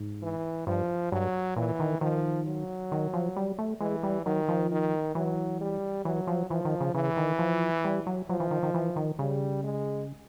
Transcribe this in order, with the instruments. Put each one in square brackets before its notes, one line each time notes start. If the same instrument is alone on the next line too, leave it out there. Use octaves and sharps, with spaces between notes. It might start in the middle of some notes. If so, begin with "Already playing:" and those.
Already playing: [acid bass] G#2
[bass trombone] E3
[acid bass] G2 [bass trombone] F3
[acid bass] G2 [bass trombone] F#3
[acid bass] A#2 [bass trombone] E3
[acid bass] D#3
[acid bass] D#3 [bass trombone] F3
[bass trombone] F#3
[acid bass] D#3
F3
G3
A3
[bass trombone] E3 [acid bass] G#3
[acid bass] G3
[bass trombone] D#3 [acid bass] F#3
[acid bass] F3
[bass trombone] D#3
[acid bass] E3 [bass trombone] F#3
[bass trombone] G3
[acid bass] E3 [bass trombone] F#3
[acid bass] F3
[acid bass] E3 [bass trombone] F3
[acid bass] D#3
C#3
[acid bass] C#3 [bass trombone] E3
[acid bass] D#3
F3
G3
F#3
[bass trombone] F3 [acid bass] F#3
[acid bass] E3
D#3
D#3
E3
D#3
[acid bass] C#3 [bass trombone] G3
[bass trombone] G#3